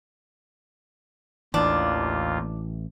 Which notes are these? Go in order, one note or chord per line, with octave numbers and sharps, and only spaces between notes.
A1 D#2 E3 D4 F4